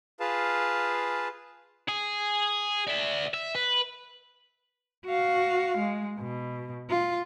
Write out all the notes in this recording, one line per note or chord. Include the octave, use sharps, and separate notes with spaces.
F4 G#4 B4 F5 A5
G#4
D5 E5
E5
B4
F#4 F5
G#3
B2
F4